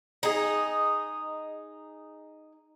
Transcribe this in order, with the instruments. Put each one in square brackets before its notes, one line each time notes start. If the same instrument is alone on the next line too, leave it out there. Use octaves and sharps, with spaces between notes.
[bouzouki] D#4 G#4